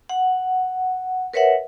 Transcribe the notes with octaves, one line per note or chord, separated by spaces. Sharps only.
F#5
A#4 B4 C#5 E5 F#5